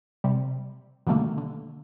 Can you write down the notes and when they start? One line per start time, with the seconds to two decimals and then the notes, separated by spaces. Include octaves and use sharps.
0.24 C3 G3
1.07 B2 D3 D#3 G3 A3 A#3
1.37 D3